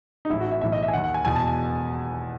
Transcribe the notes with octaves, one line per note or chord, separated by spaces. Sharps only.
D#4
A1 A2 E3 E4
F#4
E5
B1 A2 E3 E5
D#5
E5
G#5
D#2 D#3 F#5
F#5
G#5
E1 E2 B2 G#5
A5